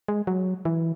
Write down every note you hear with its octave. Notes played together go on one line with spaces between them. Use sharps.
G#3
F#3
E3